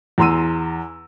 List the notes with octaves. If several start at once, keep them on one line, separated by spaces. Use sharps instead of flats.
E2 A#5 C6 E6 D#7